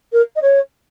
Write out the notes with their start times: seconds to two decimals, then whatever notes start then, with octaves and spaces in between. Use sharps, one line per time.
0.12 A#4
0.35 D#5
0.41 C#5